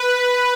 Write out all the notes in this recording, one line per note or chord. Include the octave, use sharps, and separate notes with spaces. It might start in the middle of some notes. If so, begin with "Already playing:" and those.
Already playing: B4